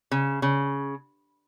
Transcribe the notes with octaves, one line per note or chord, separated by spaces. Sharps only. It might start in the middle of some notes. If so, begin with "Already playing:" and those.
C#3
C#3